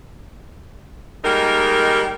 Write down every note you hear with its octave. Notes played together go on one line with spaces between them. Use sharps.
G3 G#3 A#3 D#4 A#4